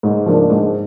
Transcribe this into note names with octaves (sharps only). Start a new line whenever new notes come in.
G#2
F3 A#3 D4
G#2